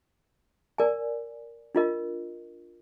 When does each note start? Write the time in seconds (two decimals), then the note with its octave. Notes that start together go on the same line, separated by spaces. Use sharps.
0.78 A#4 D5 G#5
1.75 D4 F4 A#4 D#5